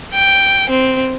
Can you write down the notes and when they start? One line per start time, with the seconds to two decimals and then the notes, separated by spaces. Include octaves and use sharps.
0.14 G5
0.70 C4